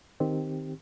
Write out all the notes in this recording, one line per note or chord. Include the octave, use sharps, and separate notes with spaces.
D#3 C4 G4